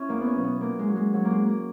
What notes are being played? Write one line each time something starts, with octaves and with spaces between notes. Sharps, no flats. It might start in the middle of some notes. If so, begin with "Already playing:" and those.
Already playing: C#4 E4
E2 A#3
B3
C#4
B2 F#3
B3
A#2 A#3
G#3
F#3
G#3
A#2 F#3
A#3
G#3
F#3
A#3